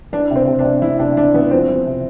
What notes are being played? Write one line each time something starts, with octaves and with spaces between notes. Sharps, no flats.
E3 D4
C3 C4
C3
D4
C3
E3 E4
C3 D4
E3 D4
E3 B3
F3 C4
F3
C3